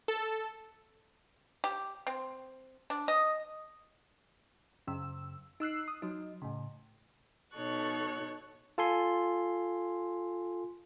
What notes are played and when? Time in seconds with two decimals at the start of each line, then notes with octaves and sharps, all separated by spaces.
0.08 A4
1.64 G4
2.07 C4
2.90 D4
3.08 D#5
4.87 F#2 C#3 E6
5.60 D#4 E6 F#6 C7
5.88 D#6
6.02 F#3 D#4
6.42 A2 C#3
7.54 B2 D#4 A4 C#5 C#6 F#6
8.78 F4 A4 G#5 C6